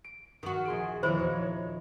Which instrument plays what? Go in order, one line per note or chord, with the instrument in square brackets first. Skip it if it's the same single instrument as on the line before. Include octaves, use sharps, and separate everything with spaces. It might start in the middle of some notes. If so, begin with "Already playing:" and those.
[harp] D7
[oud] D#3 F#4
[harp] A#1 C6 D7 [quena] G#4
[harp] D#1 E2 F3 [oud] E4 [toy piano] C5 [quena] C#5
[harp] D#4 F#4